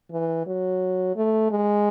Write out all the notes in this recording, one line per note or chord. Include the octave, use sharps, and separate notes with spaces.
E3
F#3
A3
G#3